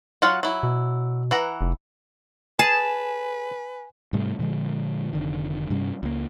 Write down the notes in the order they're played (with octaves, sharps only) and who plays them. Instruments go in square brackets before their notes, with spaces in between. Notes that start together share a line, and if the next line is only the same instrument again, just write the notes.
[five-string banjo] F#3 F4 F#5
F#3 E4
[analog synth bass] B2
[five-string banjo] E3 F#5 A#5
[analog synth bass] F1
[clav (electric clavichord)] G#4 [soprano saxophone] B4 [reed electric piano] G#5 [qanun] A5
[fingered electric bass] G#2 C3 G3 A3
A#2 D3 F3 G#3
F1 D3 D#3
G2 C3 G3 C#4
C#2 A#3